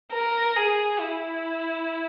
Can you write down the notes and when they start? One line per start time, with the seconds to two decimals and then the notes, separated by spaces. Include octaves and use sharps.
0.13 A#4
0.56 G#4
1.01 E4